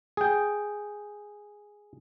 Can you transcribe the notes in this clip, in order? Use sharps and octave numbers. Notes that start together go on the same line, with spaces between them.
G#4 G5